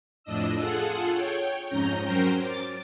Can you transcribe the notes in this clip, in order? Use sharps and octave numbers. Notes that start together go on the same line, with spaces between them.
F2 A2 D4 D#5 E6
F4 G#4 A4 F#5
C#5 G5
F2 G#2 C#4 A#5 G6
F#3 C#4 A#4 C5 G5
D6 A6